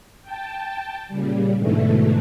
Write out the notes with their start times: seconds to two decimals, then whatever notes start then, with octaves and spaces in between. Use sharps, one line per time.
0.22 G5 A5
1.08 A#2 C#3 G3
1.56 G#2 B2 D3 E3 A3